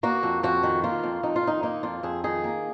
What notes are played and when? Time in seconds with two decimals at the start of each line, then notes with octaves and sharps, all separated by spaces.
0.03 A#3 F#4
0.23 F2
0.43 F2 F#4
0.63 D#3
0.84 A#3 F4
1.03 F2
1.23 F2 D#4
1.36 F4
1.43 D#3 D#4
1.63 A#3 D#4
1.83 F2 F4
2.03 F2 G#4
2.24 D#3 G#4
2.44 A#3